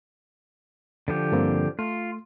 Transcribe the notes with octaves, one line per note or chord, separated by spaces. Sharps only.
D3 F3 G4
G2 A#3 C4
A3 F4